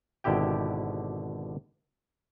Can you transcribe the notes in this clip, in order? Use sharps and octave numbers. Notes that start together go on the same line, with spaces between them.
G#1 B2 D3 E4 G4 G5